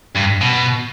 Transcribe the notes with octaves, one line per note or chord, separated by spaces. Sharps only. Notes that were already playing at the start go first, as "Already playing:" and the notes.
G2
B2